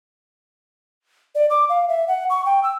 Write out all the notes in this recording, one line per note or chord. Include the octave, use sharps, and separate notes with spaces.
D5
D6
F5
E5
F#5
C#6
G5
E6